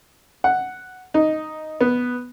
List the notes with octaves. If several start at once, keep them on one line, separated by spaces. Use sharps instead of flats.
F#5
D#4
B3